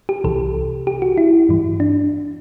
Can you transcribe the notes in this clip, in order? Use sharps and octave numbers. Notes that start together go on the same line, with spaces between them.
G4
C2 C3 E3 A4
G4
F#4
E4
G2 E3
D4